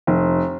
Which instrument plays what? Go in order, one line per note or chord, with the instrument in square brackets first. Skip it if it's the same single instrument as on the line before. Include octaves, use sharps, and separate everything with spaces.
[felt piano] F1